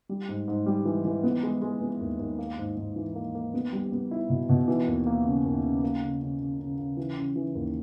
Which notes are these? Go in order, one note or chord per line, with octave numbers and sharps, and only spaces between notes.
G3
G#2
G#2
G3
E3
E3
B3
G#3
G#3
B3
D#2
D#2
A#3
G#2
G#2
E3
A#3
A#3
B3
G3
B3
E4
B2
B2
E3
D#2
A#3
C#3
D#2
C#3
A#3
C#3
C#3
C#3
C#3
C#3
E3
C#3
E3
D#2